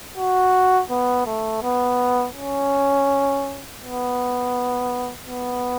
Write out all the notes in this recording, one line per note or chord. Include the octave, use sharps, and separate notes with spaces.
F#4
B3
A3
B3
C#4
B3
B3